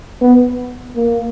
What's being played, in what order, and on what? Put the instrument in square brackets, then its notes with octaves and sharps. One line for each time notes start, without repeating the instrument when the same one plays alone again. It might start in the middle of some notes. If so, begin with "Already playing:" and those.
[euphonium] B3
A#3